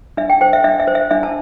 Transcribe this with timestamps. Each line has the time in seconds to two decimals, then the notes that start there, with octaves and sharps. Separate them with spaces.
0.17 D4 E5
0.30 G5
0.41 C5 G5
0.53 E5
0.64 D4 E5
0.80 E5
0.87 C5
0.95 E5
1.11 D4 E5
1.23 A5